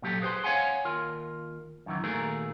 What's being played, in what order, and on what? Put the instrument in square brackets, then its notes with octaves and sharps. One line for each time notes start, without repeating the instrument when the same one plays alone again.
[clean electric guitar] A#2 F#3 G4 A4
G#4 B4 C5 G5 C6
C#5 F5 F#5 G#5 C6
D#2 F4 A#4
F#2 D#3 E3
A#2 D#3 A3 F#4 G#4 A#4